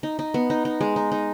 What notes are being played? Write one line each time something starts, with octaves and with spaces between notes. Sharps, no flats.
D#4
D#4
B3
D#4
D#4
G#3
D#4
D#4